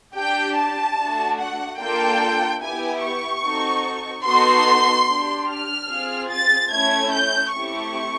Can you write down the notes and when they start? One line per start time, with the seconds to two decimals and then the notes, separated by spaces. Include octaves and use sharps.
0.15 D4 G4 G5
0.56 A5
0.97 A3 D4 F#4
1.39 F#5
1.79 A#3 D4 F4 A4 G5
2.61 B3 E4 G4 G#5
3.02 C#6
3.44 C4 D#4 F#4 A4
4.24 B3 D#4 F#4 A4 C6
5.07 D4 G4
5.48 F6
5.89 C4 F4 G#4
6.30 A6
6.71 A3 C#4 E4 G#6
7.11 G6
7.53 A3 C4 E4 G4 C#6